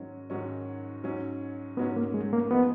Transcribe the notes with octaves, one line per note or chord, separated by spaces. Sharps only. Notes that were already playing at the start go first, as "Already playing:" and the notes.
Already playing: G#2 D#3 F#3 C#4
G#2 D#3 F#3 C#4
G#2 F#3 C#4
G#2 F#3 B3 C#4
A#3
G#3
A#3
F3 G#3 B3 D#4